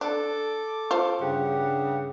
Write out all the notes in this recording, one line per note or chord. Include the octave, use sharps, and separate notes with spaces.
D4 A4 D6
F4 C5
G2 C#3 G4 F#5